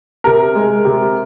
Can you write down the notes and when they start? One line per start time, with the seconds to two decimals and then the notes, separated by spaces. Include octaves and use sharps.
0.24 C3 A#4
0.55 G#3
0.85 C3